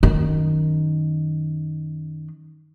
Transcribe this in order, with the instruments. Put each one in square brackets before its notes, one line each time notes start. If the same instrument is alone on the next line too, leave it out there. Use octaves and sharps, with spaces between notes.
[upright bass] F#2 D#3